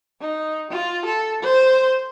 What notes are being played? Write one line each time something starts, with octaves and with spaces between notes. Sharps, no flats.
D#4
F4
A4
C5